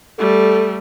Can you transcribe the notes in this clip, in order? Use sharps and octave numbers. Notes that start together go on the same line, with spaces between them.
G3 A3 A4